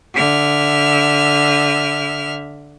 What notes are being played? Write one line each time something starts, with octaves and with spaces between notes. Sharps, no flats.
D3 E5 F6